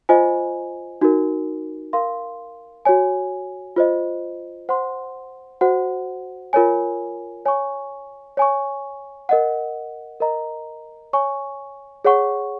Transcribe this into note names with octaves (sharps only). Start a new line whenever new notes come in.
F4 C5 D#5 G#5
D#4 F#4 A#4
A#4 F5 C6
F#4 C#5 G#5
F4 C5 D#5
C5 F#5 C6
F#4 C5 F#5
F4 A#4 C#5 G#5
C#5 G#5 C#6
C#5 G#5 C#6
A#4 D#5 F#5
A#4 D#5 A#5
C#5 G#5 C#6
G#4 C#5 F#5 C#6